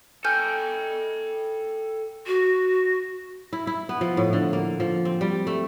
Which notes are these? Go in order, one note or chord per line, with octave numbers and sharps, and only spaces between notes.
A4 G5 G#5 F6 G6
F#4
E4
E4
B3
F3
A2
D3
A#3
F3
C4
G3
A3